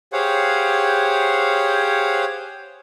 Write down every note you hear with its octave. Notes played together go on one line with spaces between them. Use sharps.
G4 G#4 C5 C#5 F5 F#5